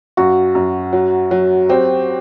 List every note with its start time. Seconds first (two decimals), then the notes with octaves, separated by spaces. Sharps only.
0.17 F#2 F#4
0.55 F#2
0.93 F#3
1.31 F#3
1.69 C4 G4